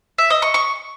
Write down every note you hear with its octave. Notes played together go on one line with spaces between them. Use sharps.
E5
D#5
C#6
C#6